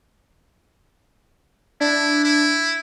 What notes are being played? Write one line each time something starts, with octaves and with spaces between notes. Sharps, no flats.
D4 E4
E4